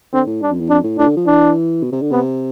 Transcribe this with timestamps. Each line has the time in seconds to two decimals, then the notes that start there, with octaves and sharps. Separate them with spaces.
0.13 D3 C4
0.27 A2
0.42 G2 D4
0.51 F2
0.60 E2
0.69 F2 D4
0.84 A2
0.98 A2 D4
1.07 D3
1.17 F3
1.27 E3 D4
1.83 B2
1.92 C3
2.02 D3
2.12 C3 B3